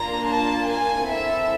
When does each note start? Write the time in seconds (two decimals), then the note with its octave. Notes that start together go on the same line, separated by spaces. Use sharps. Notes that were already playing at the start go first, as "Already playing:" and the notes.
Already playing: A#3 D4 F4 A#5
0.29 A5
0.69 G#5
1.08 C4 E4 A4 E5